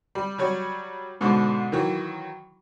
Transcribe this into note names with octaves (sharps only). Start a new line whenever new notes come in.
G3
F#3 G3 C#5
G#2 B2 D3
D#3 E3 F#3